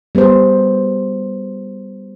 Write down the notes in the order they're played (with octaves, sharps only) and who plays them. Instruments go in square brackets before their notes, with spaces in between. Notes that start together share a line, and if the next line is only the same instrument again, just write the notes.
[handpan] G3 B3 G#4 C5